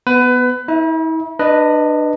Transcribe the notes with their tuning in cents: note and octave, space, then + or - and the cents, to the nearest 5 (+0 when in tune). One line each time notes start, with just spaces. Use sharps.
B3 +0 B4 +25
E4 -45 E5 +0
D4 +30 B4 +0 D#5 +0